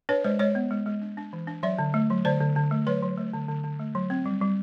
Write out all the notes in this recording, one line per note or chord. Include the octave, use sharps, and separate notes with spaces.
D4 B4 C#5
G#3 C5 D5
G#3 C#5 D#5
B3
G#3
G#3
D4
D4
E3
D4
F#3 D5 E5
D3
A3
F#3
D3 C5 D5
D3
D3
A3
F#3 B4 C#5
F#3
A3
D3
D3
D3
A3
F#3
C4
G3
G3